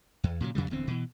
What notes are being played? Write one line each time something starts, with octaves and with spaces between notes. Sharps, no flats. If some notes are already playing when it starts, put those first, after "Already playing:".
E2
A#2 C#3 E3 F#3
F2 C#3 F#3 G3
D1 E2 D3 C4
B2 E3